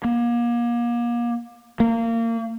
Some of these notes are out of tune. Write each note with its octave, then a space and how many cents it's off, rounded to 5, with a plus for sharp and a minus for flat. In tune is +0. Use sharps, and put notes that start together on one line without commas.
A#3 +35
A#3 -25